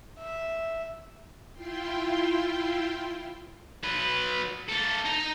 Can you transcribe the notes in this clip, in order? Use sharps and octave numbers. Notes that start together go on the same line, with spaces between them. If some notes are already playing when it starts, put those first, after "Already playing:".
E5
E4 F4 G5 C6
F#3 B4
A#3 A4
D#4 A#5